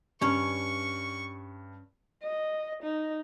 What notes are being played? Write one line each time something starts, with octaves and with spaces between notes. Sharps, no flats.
G2 C#4 C#5 C#6
D#5
D#4